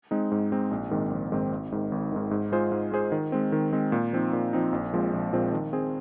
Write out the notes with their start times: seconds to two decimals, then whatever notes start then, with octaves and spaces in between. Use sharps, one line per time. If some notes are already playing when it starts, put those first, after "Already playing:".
0.11 G#3 C4 D#4
0.32 G#2
0.52 G#3 C4 D#4
0.71 A#1
0.91 G#2 D#3 C4
1.11 A#1
1.32 G#2 D#3 C4
1.52 G#1
1.72 G#2 D#3
1.92 G#1
2.12 G#2 D#3
2.31 G#2
2.52 G#3 F4 G#4 C5
2.72 G#2
2.92 G#3 F4 G#4 C5
3.12 D#3
3.32 G#3 C4
3.52 D#3
3.73 G#3 C4
3.92 A#2
4.13 F3 C4 D#4
4.33 A#2
4.53 F3 C4 D#4
4.73 A#1
4.93 A#2 F3 G#3 C4
5.13 A#1
5.33 A#2 F3 G#3 C4
5.52 D#3
5.73 C4 G#4